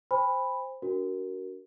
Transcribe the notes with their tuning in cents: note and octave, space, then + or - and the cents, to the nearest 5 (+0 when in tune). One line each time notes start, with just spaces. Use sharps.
C5 +0 G#5 -40 B5 +0
D4 -25 F#4 +20 A#4 +0